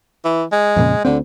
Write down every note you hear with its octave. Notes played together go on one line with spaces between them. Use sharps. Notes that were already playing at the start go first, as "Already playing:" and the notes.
E3
G#3
F2 A#2 C#3
D2 D3 C4